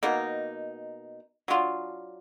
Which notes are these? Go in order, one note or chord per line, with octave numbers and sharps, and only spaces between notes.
B2 A#3 D#4
F#3 D4 F4